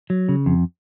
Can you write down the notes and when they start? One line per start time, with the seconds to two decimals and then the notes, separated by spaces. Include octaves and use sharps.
0.10 F#3
0.29 C#3
0.46 F2